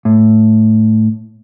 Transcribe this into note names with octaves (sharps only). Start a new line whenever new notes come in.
A2